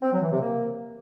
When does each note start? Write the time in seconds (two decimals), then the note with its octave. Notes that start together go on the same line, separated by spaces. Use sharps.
0.02 C4
0.12 F#3
0.22 E3
0.32 C3
0.41 A#3